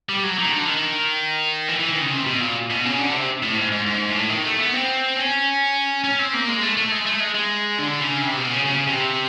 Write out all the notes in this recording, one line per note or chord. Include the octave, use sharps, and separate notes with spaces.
G3
F#3
D#3
D3
D#3
E3
E3
D#3
C#3
C3
B2
A#2
B2
C#3
D3
C3
A2
G#2
G#2
G#2
A2
D#3
A3
B3
C4
C#4
C#4
C4
A#3
G#3
A3
A3
G#3
A3
G#3
G#3
D3
C#3
C3
B2
C#3
C#3
C3